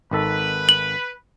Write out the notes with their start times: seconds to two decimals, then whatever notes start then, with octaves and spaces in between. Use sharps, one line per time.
0.11 G#1 D#3 A4 B4
0.69 F#7